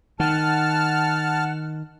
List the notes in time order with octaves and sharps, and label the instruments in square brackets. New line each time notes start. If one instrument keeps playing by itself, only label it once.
[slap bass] D#3 [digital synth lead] F#5 [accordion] A5 F6